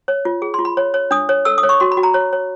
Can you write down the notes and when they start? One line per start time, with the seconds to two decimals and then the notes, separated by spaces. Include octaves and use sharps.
0.08 C#5
0.25 F4
0.42 G#4
0.54 F4 C6
0.65 B5
0.77 C#5
0.94 C#5
1.11 D4 D#6
1.29 C#5
1.45 A4 E6
1.58 D#6
1.63 C#5
1.69 C#6
1.80 F#4 C6
1.92 B5
1.97 F#4
2.03 A#5
2.14 C#5
2.33 C#5